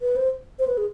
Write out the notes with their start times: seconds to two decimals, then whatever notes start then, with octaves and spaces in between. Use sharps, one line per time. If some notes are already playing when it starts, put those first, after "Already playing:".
0.02 B4
0.16 C5
0.59 C5
0.67 B4
0.78 G#4